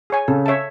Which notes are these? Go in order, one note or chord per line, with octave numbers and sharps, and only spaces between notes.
G#4 C#5 G#5
C#3 A4
C#5 E5 A5